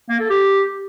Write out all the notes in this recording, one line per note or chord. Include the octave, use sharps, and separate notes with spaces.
A#3
A4
G4